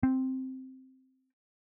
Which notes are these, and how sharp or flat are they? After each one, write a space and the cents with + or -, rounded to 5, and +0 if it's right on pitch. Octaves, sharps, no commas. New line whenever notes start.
C4 +0